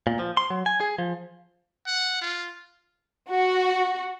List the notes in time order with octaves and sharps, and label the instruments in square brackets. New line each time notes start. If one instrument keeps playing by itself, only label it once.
[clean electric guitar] A#2
F3
C6
F#3
G#5
G#4
F3
[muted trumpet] F#5
F4
[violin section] F#4